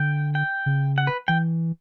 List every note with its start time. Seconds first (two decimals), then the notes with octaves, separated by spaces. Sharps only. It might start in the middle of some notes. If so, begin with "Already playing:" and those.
Already playing: D3 G5
0.35 G5
0.66 C#3
0.98 F#5
1.07 B4
1.28 E3 G5